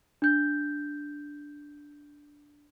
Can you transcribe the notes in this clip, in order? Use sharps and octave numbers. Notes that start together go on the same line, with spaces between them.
D4 G6